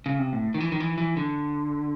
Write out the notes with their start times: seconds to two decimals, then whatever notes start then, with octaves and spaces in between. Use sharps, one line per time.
0.06 C#3
0.19 C3
0.33 A2
0.54 D#3
0.60 E3
0.72 D#3
0.80 E3
0.98 E3
1.17 D3